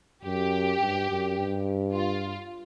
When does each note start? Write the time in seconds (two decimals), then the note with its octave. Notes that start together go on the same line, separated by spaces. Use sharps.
0.25 F#2 G4
0.81 G2
1.10 F#2
1.37 G2
1.94 F4